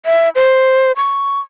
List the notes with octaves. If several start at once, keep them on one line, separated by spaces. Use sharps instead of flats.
E5
C5
C#6